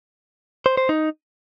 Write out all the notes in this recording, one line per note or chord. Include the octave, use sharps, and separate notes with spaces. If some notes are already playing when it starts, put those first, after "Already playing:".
C5
C5
D#4